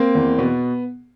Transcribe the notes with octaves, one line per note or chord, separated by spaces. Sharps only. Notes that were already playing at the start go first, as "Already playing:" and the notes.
Already playing: A#3 C4
E2
B2 B3